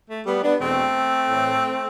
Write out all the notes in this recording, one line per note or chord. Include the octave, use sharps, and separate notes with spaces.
A3
G3 B3
B3 D4
E2 B2 A3 C4
A2 E3